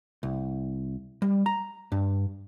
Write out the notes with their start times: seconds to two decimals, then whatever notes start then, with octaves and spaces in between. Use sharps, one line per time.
0.23 C2
1.22 G3
1.46 A#5
1.92 G2